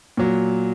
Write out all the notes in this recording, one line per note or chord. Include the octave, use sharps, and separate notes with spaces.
A#2 F#3